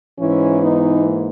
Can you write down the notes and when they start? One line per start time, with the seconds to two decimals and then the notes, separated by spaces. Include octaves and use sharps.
0.20 G#2 E3 C#4 E4
0.61 B3 D#4
1.01 A#3